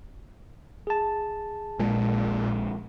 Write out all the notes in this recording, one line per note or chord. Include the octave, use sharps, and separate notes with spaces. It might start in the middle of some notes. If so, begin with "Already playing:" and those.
G#4 A5
A#1 A#2 G#3